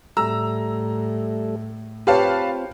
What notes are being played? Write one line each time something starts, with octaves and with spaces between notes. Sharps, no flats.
A2 G3 A3 A4 A#5 E6
C4 F4 G4 B4 C#5 F5 A5